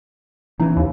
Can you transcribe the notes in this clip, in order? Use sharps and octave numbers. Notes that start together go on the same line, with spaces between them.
C#3 E3 B3 D#4
D#2